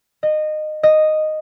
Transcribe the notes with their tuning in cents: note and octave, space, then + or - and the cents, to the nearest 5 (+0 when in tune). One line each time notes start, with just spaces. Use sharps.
D#5 -20
D#5 -5